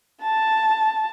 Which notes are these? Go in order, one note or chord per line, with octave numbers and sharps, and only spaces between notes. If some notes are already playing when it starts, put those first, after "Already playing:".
A5